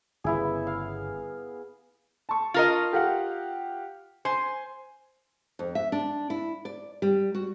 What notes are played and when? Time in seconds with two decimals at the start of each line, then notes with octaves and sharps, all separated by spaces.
0.24 G1 C#3 B3 E4 G#4
0.67 F5
2.29 A5 C#6
2.54 F4 A#4 D#5
2.93 G4 F5 F#5
4.25 C5 G#5
5.59 F2
5.75 E5
5.92 D4
6.30 E4
6.65 D5
7.02 G3
7.35 F#4